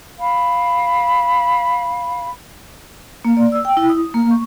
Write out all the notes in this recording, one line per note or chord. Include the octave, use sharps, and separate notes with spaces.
F5 B5
A#3
D5
E6
G5
E4
D#6
A#3
C#6